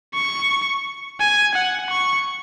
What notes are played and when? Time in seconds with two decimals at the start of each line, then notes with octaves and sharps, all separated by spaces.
0.15 C#6
1.20 G#5
1.55 F#5
1.90 C#6